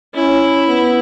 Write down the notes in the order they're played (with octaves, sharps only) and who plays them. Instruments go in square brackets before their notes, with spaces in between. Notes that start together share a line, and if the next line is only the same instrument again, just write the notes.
[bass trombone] C#4 [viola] E4
[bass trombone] B3